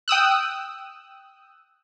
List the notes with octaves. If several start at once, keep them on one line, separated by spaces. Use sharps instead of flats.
G5 D#6 E6 F#6